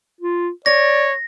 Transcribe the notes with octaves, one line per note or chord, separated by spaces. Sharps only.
F4
C#5 D5 A#6